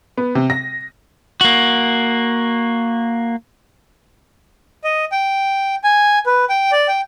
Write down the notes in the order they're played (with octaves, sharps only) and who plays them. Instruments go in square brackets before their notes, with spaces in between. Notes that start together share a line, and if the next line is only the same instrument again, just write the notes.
[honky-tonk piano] B3
C3
A#6
[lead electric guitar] A#3 F#4
[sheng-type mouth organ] D#5
G5
G#5
B4
G5
D5
G5